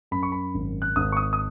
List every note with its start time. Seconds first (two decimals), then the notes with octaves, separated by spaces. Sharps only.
0.11 F#2 B5
0.23 C#6
0.32 B5
0.54 G#1
0.82 F#6
0.96 G#1 D#6
1.12 C#6
1.17 D#6
1.33 D#6